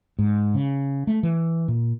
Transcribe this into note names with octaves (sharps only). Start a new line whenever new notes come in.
G#2
C#3
A3
E3
A#2